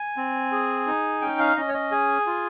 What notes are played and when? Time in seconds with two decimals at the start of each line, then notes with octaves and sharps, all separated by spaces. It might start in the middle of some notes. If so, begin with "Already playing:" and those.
Already playing: G#5
0.17 C4
0.52 G#4
0.87 D#4
1.21 C#4 G5
1.39 F5
1.56 C#4 D#5
1.68 C#5
1.74 D#5
1.91 G#4 G#5
2.27 F4